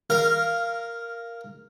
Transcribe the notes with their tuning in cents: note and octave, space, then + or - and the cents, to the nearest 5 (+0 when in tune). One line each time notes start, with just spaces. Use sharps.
A#4 +0 F5 -15